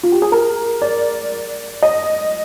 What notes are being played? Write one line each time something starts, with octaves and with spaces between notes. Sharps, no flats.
F4
G4
G#4
A#4
D5
D#5